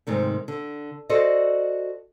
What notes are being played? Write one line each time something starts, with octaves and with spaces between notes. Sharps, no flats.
G#2 C3 D#3 A3
D3
F#4 A4 C5 D5 D#5